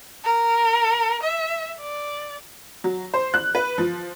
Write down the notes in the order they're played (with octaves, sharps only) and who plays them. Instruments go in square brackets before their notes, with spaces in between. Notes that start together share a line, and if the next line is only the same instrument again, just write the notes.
[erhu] A#4
E5
D5
[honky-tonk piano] F#3
C5
F#6
B4
F3